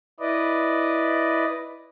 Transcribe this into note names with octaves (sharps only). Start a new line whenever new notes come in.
E4 B4 D5 D#5